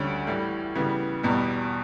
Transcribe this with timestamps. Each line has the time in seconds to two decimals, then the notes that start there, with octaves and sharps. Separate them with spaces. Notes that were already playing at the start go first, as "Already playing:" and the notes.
Already playing: D2 D3 G3 C#4
0.27 A2 E3 G3
0.75 C#3 E3 G3 B3
1.23 E2 B2 G3